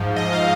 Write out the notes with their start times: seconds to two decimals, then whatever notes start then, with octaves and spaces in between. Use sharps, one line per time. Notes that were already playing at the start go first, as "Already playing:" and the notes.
Already playing: G#2 F3
0.16 G#2 D#5
0.33 F5